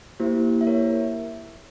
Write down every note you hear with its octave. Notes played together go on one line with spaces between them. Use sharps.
A#3 E4 G4 C5
E5
A#4 C#5